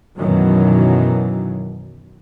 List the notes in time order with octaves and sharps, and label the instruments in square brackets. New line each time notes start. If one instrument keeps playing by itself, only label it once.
[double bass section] F#2 B2 D#3 E3 F#3